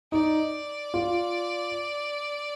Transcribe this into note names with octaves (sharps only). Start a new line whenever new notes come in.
D#4 D5
F4